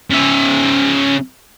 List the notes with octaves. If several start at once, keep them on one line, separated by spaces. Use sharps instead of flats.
C#3 E5